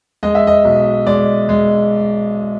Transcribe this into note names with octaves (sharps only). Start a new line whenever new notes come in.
G#3 D#5
E5
D#5
B1
G#3 D5
G#3